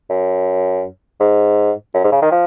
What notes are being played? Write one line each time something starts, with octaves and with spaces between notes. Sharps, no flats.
F#2
G#2
F#2
G#2
C#3
D#3
F3